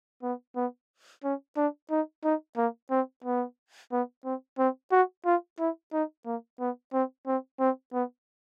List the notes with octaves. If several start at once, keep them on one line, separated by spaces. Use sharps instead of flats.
B3
B3
C#4
D4
D#4
D#4
A#3
C4
B3
B3
C4
C4
F#4
F4
E4
D#4
A#3
B3
C4
C4
C4
B3